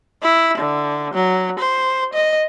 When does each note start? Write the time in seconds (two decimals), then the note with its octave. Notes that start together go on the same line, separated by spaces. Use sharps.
0.22 E4
0.58 D3
1.14 F#3
1.59 C5
2.13 D#5